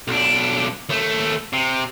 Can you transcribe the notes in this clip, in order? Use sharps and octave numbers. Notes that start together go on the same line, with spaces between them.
B1 D4
D#2 A3
C3